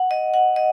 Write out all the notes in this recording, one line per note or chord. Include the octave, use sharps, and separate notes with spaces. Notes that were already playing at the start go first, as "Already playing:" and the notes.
Already playing: F#5
D#5
F#5
D#5